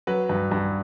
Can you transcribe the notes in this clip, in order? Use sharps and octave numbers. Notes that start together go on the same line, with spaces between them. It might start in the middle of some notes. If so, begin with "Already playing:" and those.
F#3 B4
G2
G2